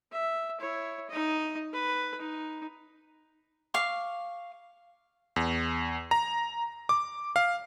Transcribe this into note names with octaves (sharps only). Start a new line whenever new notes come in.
E5
E4 C#5
D#4 D#5
B4
D#4
F5 C#6 D6
E2
A#5
D6
F5